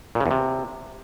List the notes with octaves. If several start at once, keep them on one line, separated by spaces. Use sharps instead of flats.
A#2
C#3
E2
C3